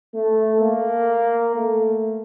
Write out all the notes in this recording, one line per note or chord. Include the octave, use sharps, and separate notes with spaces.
A3
A#3
A3